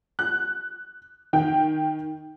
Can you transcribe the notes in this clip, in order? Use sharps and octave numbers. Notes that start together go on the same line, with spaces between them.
F#6
D#3 G5